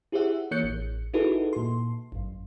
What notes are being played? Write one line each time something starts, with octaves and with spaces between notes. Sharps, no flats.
E4 G4 G#4 C5 E5 F#5
E3 A#3 C#5 F#6 G6 C#7
A1
D#4 E4 F#4 G#4 A4 B4
A#2 C6
G#1 F#2